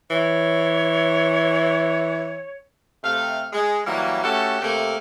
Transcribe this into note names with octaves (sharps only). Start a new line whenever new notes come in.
E3 C#5
C3 A3 F5
G#3
E3 F#3 G3 A#3
A3 C#4 F#4 G4 A4
C3 A3 A#3